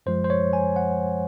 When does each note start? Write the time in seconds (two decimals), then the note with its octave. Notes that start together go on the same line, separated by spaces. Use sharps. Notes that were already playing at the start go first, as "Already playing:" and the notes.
0.06 F#2 F3 G#3 C5
0.24 C5
0.30 C#5
0.53 G#5
0.76 F#5